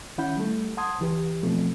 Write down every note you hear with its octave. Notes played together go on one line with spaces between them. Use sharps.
D#3 C#4 E4 F#5 B5 G6
G3 A3
F#5 A5 C6 D#6 G#6
C#2 E3 G4 B4
B2 F3 A3 C4